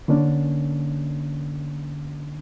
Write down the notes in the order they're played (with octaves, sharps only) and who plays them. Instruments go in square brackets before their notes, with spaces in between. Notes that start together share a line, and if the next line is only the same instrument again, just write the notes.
[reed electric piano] D3 A#3 C#4 D4